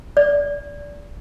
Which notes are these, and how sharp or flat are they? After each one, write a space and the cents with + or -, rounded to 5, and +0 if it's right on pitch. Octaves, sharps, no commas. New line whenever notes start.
D5 -20